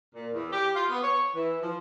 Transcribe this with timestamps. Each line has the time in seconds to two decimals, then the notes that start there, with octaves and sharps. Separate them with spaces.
0.14 A#2
0.33 E2
0.52 G4
0.74 F4
0.89 B3
1.02 C#5
1.35 E3
1.62 F3